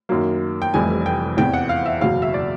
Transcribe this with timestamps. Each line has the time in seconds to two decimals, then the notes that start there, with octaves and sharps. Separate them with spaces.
0.09 F#2 D#3 F#3 A#3
0.62 G5
0.74 F1 F2 C3 E3 G3 G#5
1.06 G5
1.37 E2 C3 E3 G5
1.54 F#5
1.69 F5
1.86 E5
2.01 F#1 E2 B2 F#3 F5
2.22 E5
2.34 D5